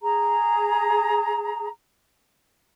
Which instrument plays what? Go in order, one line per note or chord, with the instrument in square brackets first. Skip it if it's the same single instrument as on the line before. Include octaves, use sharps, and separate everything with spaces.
[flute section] G#4 A#5